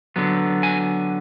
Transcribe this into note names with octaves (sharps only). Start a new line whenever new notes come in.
D3 F#3 B3
G#5